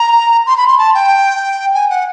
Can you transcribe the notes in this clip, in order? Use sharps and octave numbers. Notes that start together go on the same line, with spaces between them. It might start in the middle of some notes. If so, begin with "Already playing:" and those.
Already playing: A#5
C6
B5
C6
A5
G5
G#5
F#5